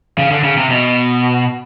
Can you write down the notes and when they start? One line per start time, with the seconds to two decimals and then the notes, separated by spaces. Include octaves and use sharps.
0.18 C#3
0.31 D3
0.44 C#3
0.57 C3
0.70 B2